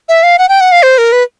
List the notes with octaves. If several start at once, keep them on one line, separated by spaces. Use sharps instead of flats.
E5
F5
F#5
G5
F#5
F5
C5
A#4
B4